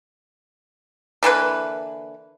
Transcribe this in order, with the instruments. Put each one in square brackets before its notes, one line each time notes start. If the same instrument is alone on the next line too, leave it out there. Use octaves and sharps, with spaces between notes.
[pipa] D3 E3 A#3 B4